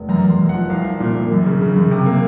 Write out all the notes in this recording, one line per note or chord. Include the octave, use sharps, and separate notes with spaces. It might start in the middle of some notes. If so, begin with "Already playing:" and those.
Already playing: F1
F#2 A#5
F#2
C6
F#2
F#5
F3
C2 F5
C2
A#2
A#2
F#2
C#3
C#3
F#2
C3
A#3